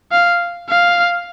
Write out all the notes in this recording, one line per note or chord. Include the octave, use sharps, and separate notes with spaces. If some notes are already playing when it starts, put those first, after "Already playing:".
F5
F5